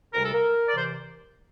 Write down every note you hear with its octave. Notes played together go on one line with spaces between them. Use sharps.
D2 C3 G3 A#4
A4
A#4
D5
C3 E3 C5